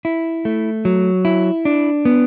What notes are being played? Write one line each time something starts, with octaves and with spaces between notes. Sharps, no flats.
E4
A3
F#3
E4
D4
B3